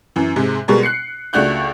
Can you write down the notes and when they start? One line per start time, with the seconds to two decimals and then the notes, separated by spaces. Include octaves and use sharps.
0.16 F#2 E3
0.36 G#2 C3 G#3
0.68 B2 G3 G#3 A#4
0.83 F#6 C7 C#7
1.33 C#2 A3 D4 F#4 F#6 G6